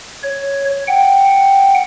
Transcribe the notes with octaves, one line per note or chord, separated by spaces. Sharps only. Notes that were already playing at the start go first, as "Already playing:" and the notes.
C#5
F#5 G5